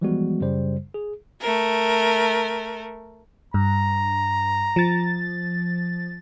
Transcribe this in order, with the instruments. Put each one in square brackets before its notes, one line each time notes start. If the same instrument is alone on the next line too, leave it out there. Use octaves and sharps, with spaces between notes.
[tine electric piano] E3 F3 G3 G#3 B3 F#4
F#2 C#3 G3 C5
G#4
[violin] A3 A#4
[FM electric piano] G2 [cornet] A#5
[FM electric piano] F3 A6